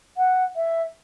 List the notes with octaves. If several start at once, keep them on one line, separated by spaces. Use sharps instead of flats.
F#5
E5